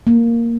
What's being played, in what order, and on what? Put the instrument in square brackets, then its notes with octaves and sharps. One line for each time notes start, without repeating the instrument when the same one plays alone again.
[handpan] A#3